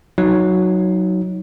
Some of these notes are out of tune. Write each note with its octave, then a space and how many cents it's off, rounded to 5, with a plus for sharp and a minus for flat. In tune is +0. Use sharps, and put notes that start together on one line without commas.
F#3 +0 D#4 +15